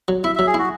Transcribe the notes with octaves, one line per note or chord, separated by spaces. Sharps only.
F#3
E4 E5
F#3 E5
G#4
E4 F#4